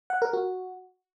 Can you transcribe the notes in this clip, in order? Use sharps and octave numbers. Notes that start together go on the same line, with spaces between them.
F#5
A#4
F#4